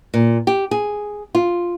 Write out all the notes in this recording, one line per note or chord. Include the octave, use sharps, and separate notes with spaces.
A#2
G4
G#4
F4